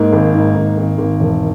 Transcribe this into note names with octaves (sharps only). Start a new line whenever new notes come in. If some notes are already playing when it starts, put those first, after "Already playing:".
Already playing: G#2 A#3
G#1
G#2
G#1
G#1
G#1
E1